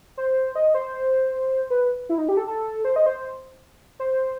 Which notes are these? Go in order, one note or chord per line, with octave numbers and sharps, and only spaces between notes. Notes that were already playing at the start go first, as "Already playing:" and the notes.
C5
D#5
C5
B4
E4
D#4
G4
A4
A4
C5
D#5
C5
C5